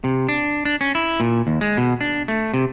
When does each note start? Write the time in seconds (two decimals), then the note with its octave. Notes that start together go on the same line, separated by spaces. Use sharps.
0.04 C3
0.29 D4
0.65 D4
0.81 C#4
0.95 E4
1.20 A#2
1.47 D#2
1.61 G#3
1.77 B2
2.01 D4
2.28 A3
2.54 C3